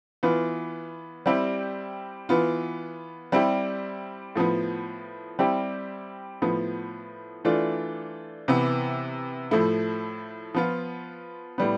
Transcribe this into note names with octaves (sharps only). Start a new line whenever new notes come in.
E3 B3 F4
G3 C4 E4 G4
E3 B3 F4
G3 C4 E4 G4
A2 F3 B3
G3 C4 E4 G4
A2 F3 B3
E3 A3 D4 F4
C3 E3 B3
A2 F3 A3 E4
F3 B3 F4
A2 G3 B3